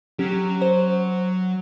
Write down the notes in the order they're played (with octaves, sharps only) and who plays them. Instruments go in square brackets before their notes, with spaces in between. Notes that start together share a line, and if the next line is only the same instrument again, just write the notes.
[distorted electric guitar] F#3 [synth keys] C#4 G4
[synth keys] C5